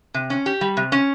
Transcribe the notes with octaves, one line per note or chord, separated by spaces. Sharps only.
C3
C#4
G4
G3
C3
C#4